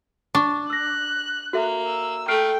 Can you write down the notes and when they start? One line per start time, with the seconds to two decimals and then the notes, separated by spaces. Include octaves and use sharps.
0.35 D4 C#6
0.70 E6 F#6 A#6
1.53 A#3 F#4 A4 E5
1.87 E6
2.28 A3 G5 F6 C7 D7